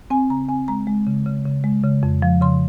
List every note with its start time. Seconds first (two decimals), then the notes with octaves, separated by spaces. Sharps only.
0.10 C4 G#5
0.30 C#3 A#5
0.49 C4 G#5
0.68 G#3 A#5
0.87 G#3
1.06 C#3
1.26 C#3
1.46 C#3
1.64 G#3
1.83 C#3
2.03 F2
2.22 F3
2.41 C#3 C6